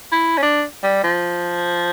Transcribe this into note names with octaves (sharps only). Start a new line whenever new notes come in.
E4
C#4
D4
G3
F3